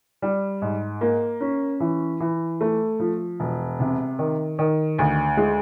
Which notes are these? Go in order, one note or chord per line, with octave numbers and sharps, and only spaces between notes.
G3
G#2
A#3
C#4
E3
E3
A3
F3
E1
C3
D#3
D#3
D2
G#3